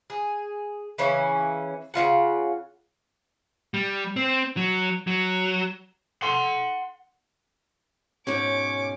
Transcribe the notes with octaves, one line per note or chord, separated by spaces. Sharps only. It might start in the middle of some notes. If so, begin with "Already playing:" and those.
G#4
C#3 E3 C#4
C#3 A#3 F4 F#5
G3
C4
F#3
F#3
F#5 C6
G#2 B2 C#4 C#5 D6